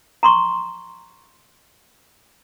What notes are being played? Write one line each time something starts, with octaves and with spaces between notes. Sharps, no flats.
A#5 C6 C#6